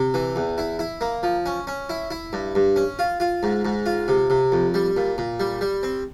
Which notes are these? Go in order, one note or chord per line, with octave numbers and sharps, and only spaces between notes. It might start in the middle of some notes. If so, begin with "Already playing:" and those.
Already playing: C3
E3
E2
E4
E4
A#3
F3
C#4
C#4
E4
E4
G2
G2
C#4
F4
F4
G#2
G#2
F4
C3
C3
F2
G3
A#2
A#2
G3
G3
C4